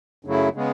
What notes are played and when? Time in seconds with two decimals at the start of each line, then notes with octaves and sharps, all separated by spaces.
0.25 F#2 C#3 F#3 A3 E4
0.54 C#3 G#3 B3